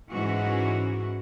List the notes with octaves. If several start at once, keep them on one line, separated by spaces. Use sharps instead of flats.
G#2 E3 G#3 C#4 F#4